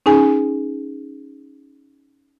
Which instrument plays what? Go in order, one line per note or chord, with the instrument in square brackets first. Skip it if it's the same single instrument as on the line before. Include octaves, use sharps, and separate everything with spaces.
[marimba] C#4 D#4 G#4 G#5